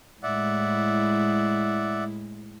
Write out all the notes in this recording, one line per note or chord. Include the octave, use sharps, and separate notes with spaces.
A2 G#3 E4 D5 E5 F#5